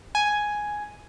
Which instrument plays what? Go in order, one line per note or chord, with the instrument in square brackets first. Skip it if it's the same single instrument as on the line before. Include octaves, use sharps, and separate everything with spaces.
[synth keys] G#5